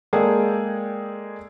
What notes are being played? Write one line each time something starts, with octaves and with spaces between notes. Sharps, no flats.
G#3 A#3 G#4 A4 D5 G5